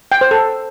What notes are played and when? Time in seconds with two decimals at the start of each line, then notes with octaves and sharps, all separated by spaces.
0.12 G5
0.21 C5
0.31 A4